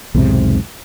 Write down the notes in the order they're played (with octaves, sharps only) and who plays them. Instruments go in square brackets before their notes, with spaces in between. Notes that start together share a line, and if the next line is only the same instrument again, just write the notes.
[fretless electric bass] B1 E2 G#2 C3